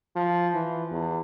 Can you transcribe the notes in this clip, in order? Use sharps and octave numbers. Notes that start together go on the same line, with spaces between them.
F3
E3
E2